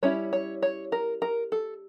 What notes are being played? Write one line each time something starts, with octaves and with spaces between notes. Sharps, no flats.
G3 C#4 E4 C#5
C#5
C#5
A#4
A#4
A4